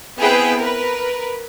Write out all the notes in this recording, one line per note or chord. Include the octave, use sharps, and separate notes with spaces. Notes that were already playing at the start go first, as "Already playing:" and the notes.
B3 C4 E4 G#4 B4 G5
A#4 B4